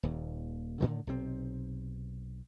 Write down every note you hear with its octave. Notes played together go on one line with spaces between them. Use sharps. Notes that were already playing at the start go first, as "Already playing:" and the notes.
D#1 D#2
A2 D3 D#3
B1 C3 C4